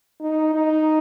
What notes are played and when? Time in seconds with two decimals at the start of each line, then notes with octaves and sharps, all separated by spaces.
0.21 D#4
0.55 D#4